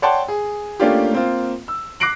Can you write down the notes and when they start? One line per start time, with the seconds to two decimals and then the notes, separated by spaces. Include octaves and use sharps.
0.02 C#5 D5 F#5 G5 A5 C6
0.28 G#4
0.80 A3 A#3 C#4 D4 F4 G4
1.12 A#3 C4 F4
1.68 E6
2.00 D6 F#6 A#6 C7 D7 F#7